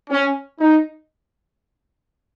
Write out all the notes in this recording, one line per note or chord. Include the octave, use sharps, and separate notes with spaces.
C#4
D#4